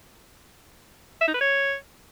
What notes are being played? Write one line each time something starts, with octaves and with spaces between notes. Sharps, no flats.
E5
D#4
B4
C#5